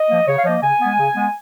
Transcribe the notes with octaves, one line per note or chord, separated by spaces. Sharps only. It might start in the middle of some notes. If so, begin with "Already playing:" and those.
Already playing: D#5
F3 A#3
C#3 C#5
F5
F3 A#3 D#5
C#3 G#5
G#3 B3
C#3
G#3 B3